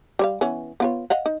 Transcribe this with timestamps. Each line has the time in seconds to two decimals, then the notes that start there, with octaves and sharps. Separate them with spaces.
0.19 G3 C#5 F5
0.41 E3 B3 C#4
0.80 B3 F4 C#5
1.10 D#5 F5 F#5
1.26 D#4